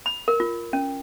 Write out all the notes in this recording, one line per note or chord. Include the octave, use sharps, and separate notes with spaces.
B5
A#4
F4
C#4